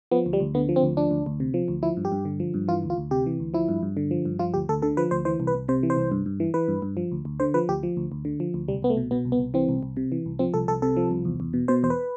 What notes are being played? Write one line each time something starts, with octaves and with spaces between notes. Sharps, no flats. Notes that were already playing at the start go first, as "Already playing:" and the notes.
F3 B3
D2
G3
D2
D3 B3
F3
C4
D2
F3 D4
D2
D2
C3
F3
D2
F3 E4
G2
G4
G2
D3
F3
G2
E3 F4
D2
F4
D2
C3 G4
E3
D2
F3 E4
G2
G2
D3
F3
G2
F3 F4
D2 G4
D2 A4
D3 A4
F3 B4
D2 C5
E3 C5
C2
B4
C2
C3 C5
E3
C5
C2
G2
G2
E3
E3 B4
G2
G2
F3
D2
D2
D3 C5
F3 B4
D2 G4
F3
D2
D2
D3
F3
D2
C2 G3
C2 B3
A3
B2
B2 B3
C2
B3
C2
E3 C4
C2
C2
C3
E3
C2
F3 C4
C2 A4
C2 A4
C3 A4
F3
C2
E2
E2
B2
B2 C5
E2 C5
B4